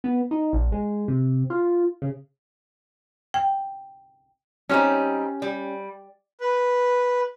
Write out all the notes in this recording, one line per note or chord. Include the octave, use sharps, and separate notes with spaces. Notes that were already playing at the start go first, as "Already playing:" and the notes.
B3
D#4
A#1
G#3
C3
F4
C#3
G5
G3 C4 C#4 D#4 G4 C#5
G3
B4